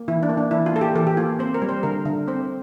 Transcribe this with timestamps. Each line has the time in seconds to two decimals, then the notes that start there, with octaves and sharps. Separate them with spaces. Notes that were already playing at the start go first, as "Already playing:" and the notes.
Already playing: A#3
0.08 E3 E4
0.23 D4
0.29 A#3
0.37 D4
0.51 E3 E4
0.66 F4
0.73 A#3 A4
0.81 G4
0.95 E3 A4
1.07 G4
1.17 A#3 F4
1.39 C4 C5
1.54 A#4
1.62 G3
1.69 C5
1.83 D3 A#4
2.05 D3
2.28 C4 C5